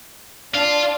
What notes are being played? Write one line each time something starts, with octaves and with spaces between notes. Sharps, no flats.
D4 F4